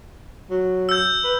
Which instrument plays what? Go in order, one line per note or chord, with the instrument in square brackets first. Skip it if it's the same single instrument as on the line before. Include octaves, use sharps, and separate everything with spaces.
[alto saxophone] F#3
[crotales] E6 G6
[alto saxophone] B4